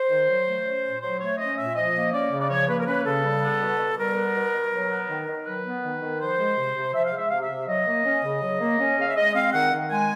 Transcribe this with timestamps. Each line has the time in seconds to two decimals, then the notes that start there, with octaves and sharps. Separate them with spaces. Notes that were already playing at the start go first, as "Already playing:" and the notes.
Already playing: C5
0.09 D#3
0.28 F#3
0.46 A3
0.64 C#4
0.83 A#2
1.02 F#3 C5
1.20 A3 C#5
1.38 C#4 D#5
1.57 A#2 E5
1.75 F3 D#5
1.94 A#3
2.12 C#4 D5
2.31 C#3
2.40 D5
2.50 F3 C#5
2.68 A#3 B4
2.79 A#4
2.86 C#4 B4
3.05 C#3 A4
3.24 G3
3.42 B3
3.61 B2
3.79 B2
3.98 G3 A#4
4.16 B3
4.35 B2
4.53 B2
4.72 F#3
4.90 B3
5.09 D#3
5.28 D#3
5.45 F#3 B4
5.65 B3
5.83 D#3
6.01 D#3
6.19 F3 C5
6.38 G#3
6.57 C3
6.75 C3
6.93 F3 E5
7.05 F5
7.12 G#3
7.17 E5
7.30 C3 F5
7.41 E5
7.49 C3
7.68 F#3 D#5
7.86 A#3
8.05 C#4
8.23 C#3
8.42 F#3
8.60 A#3
8.79 C#4
8.98 C#3 F5
9.08 E5
9.16 G#3 D#5
9.34 C4 F5
9.53 D#3 F#5
9.72 D#3
9.90 G#3 G#5